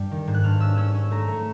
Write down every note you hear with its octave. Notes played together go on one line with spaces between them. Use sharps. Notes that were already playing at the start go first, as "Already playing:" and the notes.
Already playing: G2 G3
D#3
G#2
F#6
G2 F6
C#4 E6
C#4 E6
C#4
A3 A#5
A3